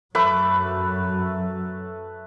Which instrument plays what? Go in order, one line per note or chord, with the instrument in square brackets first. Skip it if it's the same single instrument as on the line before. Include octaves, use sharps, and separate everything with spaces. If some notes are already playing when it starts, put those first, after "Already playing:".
[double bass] F#2 F#3 [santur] A3 B4 D6